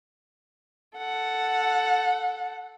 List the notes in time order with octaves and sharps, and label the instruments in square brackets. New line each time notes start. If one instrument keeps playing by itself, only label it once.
[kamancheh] A4 F#5